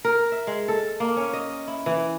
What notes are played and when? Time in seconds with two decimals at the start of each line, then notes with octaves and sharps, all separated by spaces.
0.05 A#4
0.32 E5
0.47 G#3
0.68 A4
1.00 A#3
1.17 C#4
1.33 D#5
1.67 E4
1.86 E3